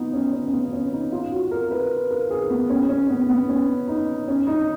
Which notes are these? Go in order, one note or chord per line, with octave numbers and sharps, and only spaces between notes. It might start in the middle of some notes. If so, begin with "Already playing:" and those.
Already playing: B3 D#4 F4
C#4
C#4
C#4
B3
C#4
D#4
F4
F#4
A#4
B4
A#4
G#4
B3
C#4
C#4
B3
B3
C#4
D#4
C#4
D#4